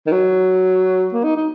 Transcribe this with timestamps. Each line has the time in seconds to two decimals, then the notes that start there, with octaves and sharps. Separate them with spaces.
0.06 D#3
0.12 F#3
1.13 A#3
1.24 D#4
1.36 D#4